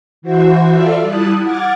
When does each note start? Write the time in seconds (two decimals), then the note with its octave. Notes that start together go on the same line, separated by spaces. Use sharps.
0.22 E3 F#4 C5 E5
0.73 F4 A4 D5 E5 F5
1.02 G3 E4 A5 D#6 F#6
1.41 F#5 D6 F6 G#6 A6